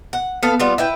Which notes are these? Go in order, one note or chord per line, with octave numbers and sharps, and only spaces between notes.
F#5
B3 A4 F5
G3 B3 F4
E4 B4 G5